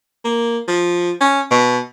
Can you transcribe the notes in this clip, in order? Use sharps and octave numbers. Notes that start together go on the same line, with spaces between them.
A#3
F3
C#4
B2